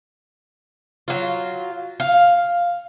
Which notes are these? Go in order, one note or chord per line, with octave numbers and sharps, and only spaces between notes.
F#3 F4
F5